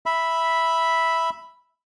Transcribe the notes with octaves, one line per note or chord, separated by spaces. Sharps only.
E5 B5